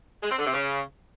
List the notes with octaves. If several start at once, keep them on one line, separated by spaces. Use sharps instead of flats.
G#3
C4
D3
C3
C#3